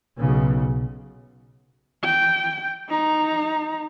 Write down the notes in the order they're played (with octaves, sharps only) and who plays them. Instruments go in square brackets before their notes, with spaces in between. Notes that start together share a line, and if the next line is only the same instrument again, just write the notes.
[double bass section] B1 C#3
[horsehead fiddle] G5
D#4 A#5